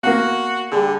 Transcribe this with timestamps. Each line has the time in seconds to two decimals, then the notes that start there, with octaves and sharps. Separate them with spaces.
0.03 A#3 B3 F#4 F5 F#5
0.72 D3 G3 D4 G#4 G#5